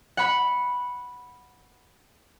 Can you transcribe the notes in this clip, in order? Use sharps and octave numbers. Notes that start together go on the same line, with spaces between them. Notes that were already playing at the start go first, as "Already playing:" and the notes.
F#5 B5